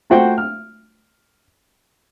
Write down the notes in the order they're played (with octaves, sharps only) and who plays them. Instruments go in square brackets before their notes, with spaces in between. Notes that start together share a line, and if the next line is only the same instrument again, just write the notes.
[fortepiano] A3 F4 F#4 C5 G5
F6